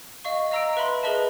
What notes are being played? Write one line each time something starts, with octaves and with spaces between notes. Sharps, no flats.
D#5 F5 C#6
D#5 F5 A#5 E6 A#6 D7
B4 E5 B5 C6
G#4 A#4 B4 D#5 E5 A5